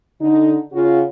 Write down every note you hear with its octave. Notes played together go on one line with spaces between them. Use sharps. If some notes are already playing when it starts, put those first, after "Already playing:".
D3 D#4
C#3 F4 F#4